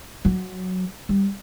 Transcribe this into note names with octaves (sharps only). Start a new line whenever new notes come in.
F#3
G3